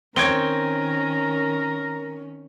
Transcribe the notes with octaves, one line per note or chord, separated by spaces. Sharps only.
D#3 C4 C#4 A#4 C#5 G#6 D7 G7